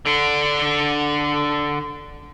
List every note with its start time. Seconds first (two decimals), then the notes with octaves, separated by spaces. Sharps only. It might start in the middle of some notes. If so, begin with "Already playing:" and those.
0.06 D3 D4